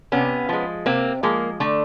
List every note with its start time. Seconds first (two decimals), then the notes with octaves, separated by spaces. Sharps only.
0.12 C3 B3 C#4
0.49 F3 G#3
0.86 C3 A#3 C4
1.23 F3 G#3 A#3
1.60 D3 A3